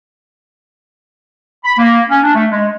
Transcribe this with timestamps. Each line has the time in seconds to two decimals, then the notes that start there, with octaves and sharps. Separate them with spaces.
1.65 B5
1.78 A#3
2.09 C#4
2.23 D4
2.35 A3
2.51 G#3